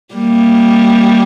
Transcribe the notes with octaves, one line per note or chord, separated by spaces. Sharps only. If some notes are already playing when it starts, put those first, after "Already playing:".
G3 A#3